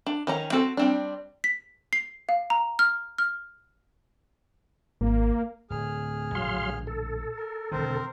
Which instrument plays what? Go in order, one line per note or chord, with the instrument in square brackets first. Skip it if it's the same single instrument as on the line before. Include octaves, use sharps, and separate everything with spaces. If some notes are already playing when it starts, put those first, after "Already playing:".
[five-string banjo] D4
D#3 C#4 A#5
C4 F#4 A4
G3 C4 D4
[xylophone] B6
C7
F5
A#5
F6
F6
[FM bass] G#1 [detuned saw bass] A#3
[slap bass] D1 [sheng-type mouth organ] G#4 F6
[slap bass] A#1 A2 D3 [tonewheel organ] F#3 F5 C6
[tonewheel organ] A4
[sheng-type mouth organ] A#4
[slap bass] E1 D3 D#3 [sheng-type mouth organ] C4 A#4 C5